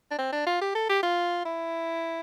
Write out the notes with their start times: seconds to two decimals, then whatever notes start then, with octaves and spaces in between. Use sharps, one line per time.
0.11 D4
0.18 C4
0.32 D4
0.47 F4
0.61 G4
0.75 A4
0.89 G4
1.03 F4
1.45 E4